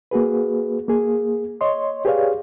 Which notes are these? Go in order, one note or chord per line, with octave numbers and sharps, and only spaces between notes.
A#3 F#4 G#4 B4
A#3 G#4
C#5 D#5 C6
G4 G#4 B4 C#5 D5 F5